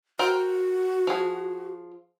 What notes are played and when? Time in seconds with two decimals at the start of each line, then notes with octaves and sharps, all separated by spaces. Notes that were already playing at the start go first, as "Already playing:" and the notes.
0.19 F#4 A#4 C5 G5
1.07 F3 G#4